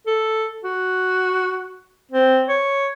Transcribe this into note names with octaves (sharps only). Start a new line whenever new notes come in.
A4
F#4
C4
C#5